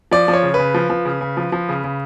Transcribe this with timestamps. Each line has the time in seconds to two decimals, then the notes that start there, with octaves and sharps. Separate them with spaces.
0.11 F3 D5
0.28 F3
0.33 C#5
0.43 C#3
0.54 C#3 B4
0.74 F3
0.90 F3
1.05 C#3
1.21 C#3
1.37 F3
1.52 F3
1.69 C#3
1.84 C#3